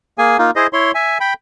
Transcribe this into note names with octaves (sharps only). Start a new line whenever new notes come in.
A#3 G#4 G#5
A#3 D#4 F4
E4 G#4 C5 D#5
E4 C#5 C6
E5 G#5
G5 B5